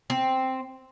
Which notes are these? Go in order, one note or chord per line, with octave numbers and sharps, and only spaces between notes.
C4